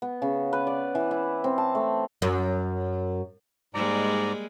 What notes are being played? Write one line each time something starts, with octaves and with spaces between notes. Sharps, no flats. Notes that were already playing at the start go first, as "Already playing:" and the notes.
B3
C#3
B4
D5
E3
E4
C4
A5
A3
F#2
G#2 G3 G#3 A#3 D5 A#5